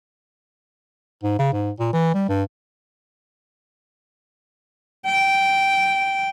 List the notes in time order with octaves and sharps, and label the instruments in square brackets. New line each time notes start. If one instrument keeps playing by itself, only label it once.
[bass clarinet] G#2
C#3
G#2
A#2
E3
G3
G2
[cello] G5